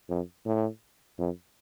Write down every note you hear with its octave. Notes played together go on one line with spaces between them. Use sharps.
F2
A2
F2